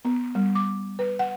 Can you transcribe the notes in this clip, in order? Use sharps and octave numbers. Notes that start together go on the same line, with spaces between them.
B3
G3
D6
B4
F#5